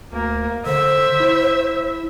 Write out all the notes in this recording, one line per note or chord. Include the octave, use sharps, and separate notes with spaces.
D2 A#3
D3 C5 E5
E4